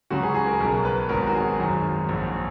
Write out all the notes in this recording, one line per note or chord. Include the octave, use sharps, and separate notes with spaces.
C#2 C#3 F#3 F#4
G#4
G#4
A#4
B1 B2 F#3 A#4
B4
G#1 G#2 F#3 A#4
F#4
G#4
G#1 F#2 D#3 F#3
A#1 G#2 F#3